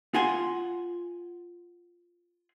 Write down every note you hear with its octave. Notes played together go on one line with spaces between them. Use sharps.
F4 F#5 G#5 C6